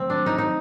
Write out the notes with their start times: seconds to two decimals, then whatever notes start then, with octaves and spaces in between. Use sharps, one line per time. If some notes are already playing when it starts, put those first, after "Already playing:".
Already playing: D#3 F#3 A3 C4
0.10 D4
0.26 D#4
0.38 D#4